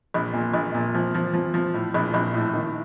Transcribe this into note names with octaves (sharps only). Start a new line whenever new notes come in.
A#1
A#2
A#1
A#2
F3
F3
F3
F3
A2
A#1
A#1
A2
D#3